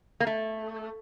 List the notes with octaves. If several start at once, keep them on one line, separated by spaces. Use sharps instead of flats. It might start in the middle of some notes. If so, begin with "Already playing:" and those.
A#3
A3